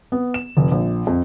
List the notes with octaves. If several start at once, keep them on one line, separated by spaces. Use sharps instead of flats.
B3
E7
F1
A#1
F2